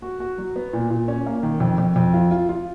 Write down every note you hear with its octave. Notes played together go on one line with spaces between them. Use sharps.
F#4
F#4
F#3
B3
A#2
A#2
C#4
A#3
D#3
F2
F2
F2
F4
F4
F4